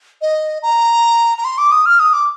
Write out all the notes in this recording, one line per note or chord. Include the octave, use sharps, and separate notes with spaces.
D#5
A#5
A#5
C6
D6
D#6
F6
D#6
D6